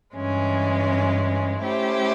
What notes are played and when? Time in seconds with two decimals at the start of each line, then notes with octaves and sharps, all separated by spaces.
0.16 G2 E3 G#3 C#4
1.63 A3 C#4 E4 G4 C5